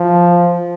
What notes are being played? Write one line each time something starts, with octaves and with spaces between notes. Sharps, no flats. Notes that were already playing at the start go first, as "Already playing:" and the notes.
Already playing: F3